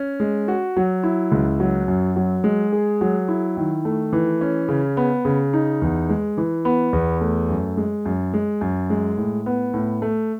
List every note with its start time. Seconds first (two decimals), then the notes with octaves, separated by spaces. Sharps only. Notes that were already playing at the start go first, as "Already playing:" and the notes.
Already playing: C#4
0.20 G#3
0.48 F#4
0.77 F#3
1.03 E4
1.31 C#2
1.60 F#3
1.88 F#2
2.16 F#3
2.44 G#3
2.72 G#4
3.01 F#3
3.28 E4
3.57 D#3
3.85 A3
4.13 E3
4.41 C#4
4.69 C#3
4.97 B3
5.25 C#3
5.53 D#4
5.82 E2
6.09 G#3
6.37 E3
6.65 B3
6.93 E2
7.21 A3
7.49 F#2
7.77 G#3
8.05 F#2
8.34 G#3
8.61 F#2
8.90 G#3
9.17 A2
9.46 B3
9.74 A2
10.02 A3